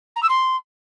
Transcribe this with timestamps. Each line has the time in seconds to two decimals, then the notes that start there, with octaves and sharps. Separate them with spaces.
0.16 A#5
0.23 E6
0.29 C6